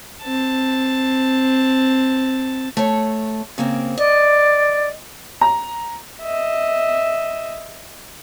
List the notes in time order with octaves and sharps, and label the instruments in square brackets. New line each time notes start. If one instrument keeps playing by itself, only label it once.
[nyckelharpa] C4 A5
[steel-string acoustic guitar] A3 C#5
C#3 A#3 C4
[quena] D5 [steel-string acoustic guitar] D#5
[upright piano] A#5
[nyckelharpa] D#5 E5